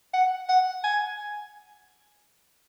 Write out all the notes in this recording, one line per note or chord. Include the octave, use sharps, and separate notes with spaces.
F#5
F#5
G#5